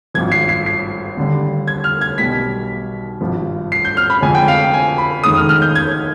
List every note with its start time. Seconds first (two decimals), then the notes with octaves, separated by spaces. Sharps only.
0.14 G#1 G2 F3 G#6
0.32 C7
0.49 C7
0.66 C7
1.17 D#2 D3 G3
1.67 G#6
1.84 F6
2.01 G#6
2.18 B1 B2 G3 B6
3.21 G#1 G2 F3
3.72 C7
3.85 G6
3.97 F6
4.10 B5
4.22 F2 D3 G#3 G#5
4.35 G5
4.48 F5
4.60 G5
4.74 G#5
4.98 B5
5.24 F1 D#2 D#3 G#3 D#6
5.37 F6
5.49 F6
5.62 G6
5.75 G#6